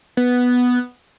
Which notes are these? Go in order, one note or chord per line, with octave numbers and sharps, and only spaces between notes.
B3